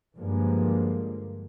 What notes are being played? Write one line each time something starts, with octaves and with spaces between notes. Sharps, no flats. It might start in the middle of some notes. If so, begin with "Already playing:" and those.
G2 D3 F3 G#3 A#3